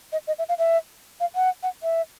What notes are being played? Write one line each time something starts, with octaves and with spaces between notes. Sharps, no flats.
D#5
D#5
E5
F5
E5
F5
F#5
F#5
E5